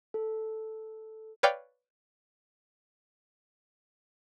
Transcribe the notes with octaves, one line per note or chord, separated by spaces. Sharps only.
A4
B4 C#5 D5 F5 G5